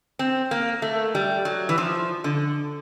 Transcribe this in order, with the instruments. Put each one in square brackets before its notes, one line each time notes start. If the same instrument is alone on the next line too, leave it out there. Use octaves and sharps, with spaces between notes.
[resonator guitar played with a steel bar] C4
A#3
A3
G3
F#3
E3
F3
D3